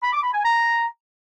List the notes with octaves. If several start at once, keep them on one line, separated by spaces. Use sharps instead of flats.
B5
D6
B5
G#5
A#5